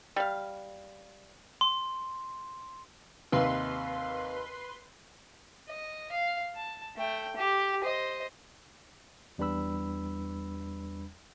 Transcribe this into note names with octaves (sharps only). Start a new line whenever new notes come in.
G3 F5
C6
D#2 C3 B4 C6
D#5
F5
A5
A3 G5
G4
C5 D#5
E2 G3 D4 B4 B5 E6